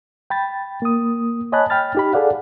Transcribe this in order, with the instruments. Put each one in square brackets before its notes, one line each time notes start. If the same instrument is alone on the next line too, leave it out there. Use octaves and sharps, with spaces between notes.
[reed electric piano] G5 B5 A6
A#3 D#6
C#5 D#5 G#5 A5 B5 F#6
G5 B5 F6 A6
D#4 G4 B5
G#4 A4 D5 F5 F#5